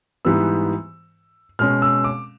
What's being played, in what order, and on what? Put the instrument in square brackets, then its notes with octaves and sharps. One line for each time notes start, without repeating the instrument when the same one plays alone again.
[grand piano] G#2 E3 G3 B3 E6
B2 G#3 C#4 F6
E6
D6